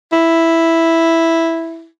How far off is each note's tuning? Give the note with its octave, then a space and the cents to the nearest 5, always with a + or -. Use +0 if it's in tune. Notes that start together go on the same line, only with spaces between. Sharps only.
E4 +0